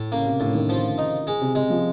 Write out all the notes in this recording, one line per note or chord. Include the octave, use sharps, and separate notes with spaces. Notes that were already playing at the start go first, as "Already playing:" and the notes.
Already playing: A2
C#3 A#3
C3
A2 D3
D#3
F3
D#4
G#3
C3
C3 G#3
F3